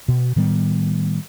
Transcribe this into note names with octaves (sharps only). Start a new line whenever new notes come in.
B2
A2 D#3 G3 B3